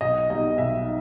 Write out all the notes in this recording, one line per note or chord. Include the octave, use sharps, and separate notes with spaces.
B1 D#5
B2 G3 D#4 D#5
B1 E5